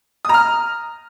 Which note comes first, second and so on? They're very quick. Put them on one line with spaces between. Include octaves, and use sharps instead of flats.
D#6 A#5 F6